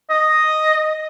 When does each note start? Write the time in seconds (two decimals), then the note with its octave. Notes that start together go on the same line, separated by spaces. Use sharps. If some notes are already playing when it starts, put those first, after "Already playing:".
0.10 D#5